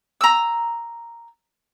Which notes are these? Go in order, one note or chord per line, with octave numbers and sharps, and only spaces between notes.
A#5 E6